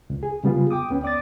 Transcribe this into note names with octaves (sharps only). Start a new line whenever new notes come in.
C#2
G#4
C#3 G3 B3 F4 G#4
G5 D6 D#6
D2 B3 C#4 G5
D5 D6 D#6 A6